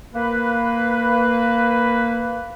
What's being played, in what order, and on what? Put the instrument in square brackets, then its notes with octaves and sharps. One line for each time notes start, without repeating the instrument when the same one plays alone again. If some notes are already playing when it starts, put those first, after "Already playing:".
[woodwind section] A#3 B4